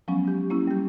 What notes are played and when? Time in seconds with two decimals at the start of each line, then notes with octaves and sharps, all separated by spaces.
0.08 F3 F#3 G#3 B3 C#4
0.24 G#3 G4
0.50 A#3 C#4 E4
0.67 G3 G4